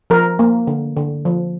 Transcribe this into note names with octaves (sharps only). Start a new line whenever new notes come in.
F3 A#4
A#3
D3
D3
F3